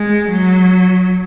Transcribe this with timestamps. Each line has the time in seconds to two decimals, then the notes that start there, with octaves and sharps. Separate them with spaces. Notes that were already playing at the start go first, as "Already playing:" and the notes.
Already playing: G#3
0.30 F#3